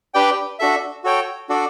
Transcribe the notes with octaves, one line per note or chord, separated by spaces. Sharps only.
D4 G4 B4 D5 G5
D4 F#4 A4 E5
F#4 A4 C#5 G5
D4 F#4 A4 D5